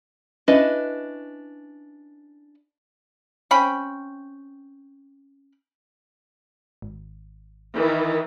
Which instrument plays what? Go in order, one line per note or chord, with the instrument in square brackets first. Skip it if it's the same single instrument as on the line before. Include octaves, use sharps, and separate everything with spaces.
[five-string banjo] C#4 D4 E4 B4 D#5
[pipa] C4 C#4 G5 B5
[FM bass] G#1
[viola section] D#3 E3